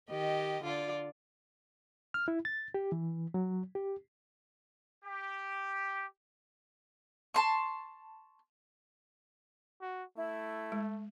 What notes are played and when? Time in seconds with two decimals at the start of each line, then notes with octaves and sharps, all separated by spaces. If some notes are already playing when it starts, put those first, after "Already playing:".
0.10 D#3 G4 D#5
0.63 D3 F4 D5
2.14 F6
2.28 E4
2.45 A6
2.74 G4
2.92 E3
3.34 F#3
3.75 G4
5.05 G4
7.34 A5 C6 C#6
9.81 F#4
10.17 A3 E4
10.72 G#3